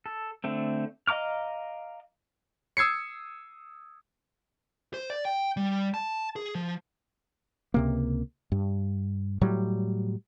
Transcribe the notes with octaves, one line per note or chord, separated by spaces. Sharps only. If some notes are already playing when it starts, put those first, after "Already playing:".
A4
D3 A3 C4
D#5 F5 A#5 D6 F6
D#6 E6 G#6 C7 C#7
C5
D5
G5
G3
A5
G#4
F3
C#2 C3 A#3
G2
A2 F#3 G3